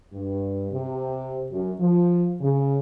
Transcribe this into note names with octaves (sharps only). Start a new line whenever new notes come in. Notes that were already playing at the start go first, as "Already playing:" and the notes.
G2
C3
F#2
F3
C#3